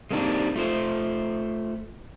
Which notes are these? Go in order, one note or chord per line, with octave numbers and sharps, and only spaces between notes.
G#3 A#3 C4 D4 D#4 G4
A3 F4 C5